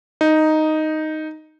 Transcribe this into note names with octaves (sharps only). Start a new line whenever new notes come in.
D#4